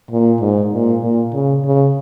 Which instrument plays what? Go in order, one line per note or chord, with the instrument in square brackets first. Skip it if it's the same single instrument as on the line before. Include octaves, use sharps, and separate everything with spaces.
[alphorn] A#2
G#2
A#2
A#2
C#3
C#3